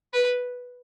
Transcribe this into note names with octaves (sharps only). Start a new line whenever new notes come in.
B4